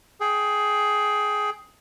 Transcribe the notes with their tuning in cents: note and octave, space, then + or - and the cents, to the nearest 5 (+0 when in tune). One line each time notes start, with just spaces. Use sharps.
G#4 +15 G5 +0